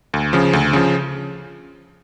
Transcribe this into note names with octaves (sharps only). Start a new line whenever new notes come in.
D2
C#3 F3
D2
C#3 F3